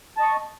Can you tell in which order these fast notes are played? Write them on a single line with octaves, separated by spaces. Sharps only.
A5 D#5 C#6